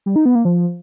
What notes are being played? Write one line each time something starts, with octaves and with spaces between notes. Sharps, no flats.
G3
D#4
B3
A#3
F3